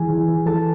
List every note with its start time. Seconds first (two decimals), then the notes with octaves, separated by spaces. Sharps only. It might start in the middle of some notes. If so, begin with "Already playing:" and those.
Already playing: E3 G#4 G#5
0.10 E3
0.29 E3
0.46 E3 A4 A5